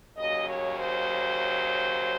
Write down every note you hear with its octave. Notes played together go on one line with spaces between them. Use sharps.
D#2 C#3 F#3 D#5
C#5
C5